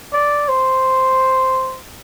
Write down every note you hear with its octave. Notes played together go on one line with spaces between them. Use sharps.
D5
C5